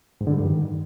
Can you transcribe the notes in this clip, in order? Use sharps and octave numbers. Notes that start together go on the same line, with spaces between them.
G#2
D3
G3
G2
D#3